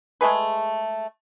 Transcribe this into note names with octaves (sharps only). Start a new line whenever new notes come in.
G#3 A3 G#4 B4